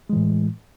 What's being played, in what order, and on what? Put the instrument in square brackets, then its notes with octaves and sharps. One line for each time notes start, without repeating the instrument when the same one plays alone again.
[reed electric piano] G#3
E3
A2